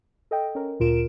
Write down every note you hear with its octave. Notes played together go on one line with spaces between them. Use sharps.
A4 D#5 G5
C#4 A#4
D2 A#2 F4 A#4 D7 E7